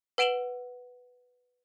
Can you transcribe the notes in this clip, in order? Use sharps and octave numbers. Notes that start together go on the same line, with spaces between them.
B4 F#5 D7 E7 F#7 G7